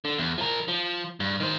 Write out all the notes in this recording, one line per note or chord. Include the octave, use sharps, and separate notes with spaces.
D3
E2
F3 A#4
F3
G2
D#3 C5